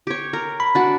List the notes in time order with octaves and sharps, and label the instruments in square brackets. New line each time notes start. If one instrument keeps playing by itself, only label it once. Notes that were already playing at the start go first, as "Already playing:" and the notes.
[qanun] G4 C#5
A#4
[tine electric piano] B5
[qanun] D4 F#4